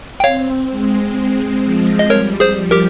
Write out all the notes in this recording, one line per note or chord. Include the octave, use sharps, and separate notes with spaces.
G5
C4 C#5 F5
G#3
G#3
F3
D#5
G3 A#4 C#5
G#4 C5
F3
G4 A#4